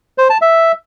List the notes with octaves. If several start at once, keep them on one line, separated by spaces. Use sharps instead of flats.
C5
A5
E5